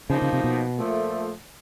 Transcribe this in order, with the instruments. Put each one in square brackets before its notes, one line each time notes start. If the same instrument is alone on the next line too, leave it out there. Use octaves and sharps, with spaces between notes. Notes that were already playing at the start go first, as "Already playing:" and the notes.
[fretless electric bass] C#3 [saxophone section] F3 A#3 D#4
[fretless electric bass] C#3
C3
B2
[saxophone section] A#2 F3 A3